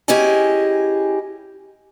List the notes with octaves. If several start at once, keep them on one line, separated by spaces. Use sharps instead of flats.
C#4 E4 G4 G#4 D#5 G#5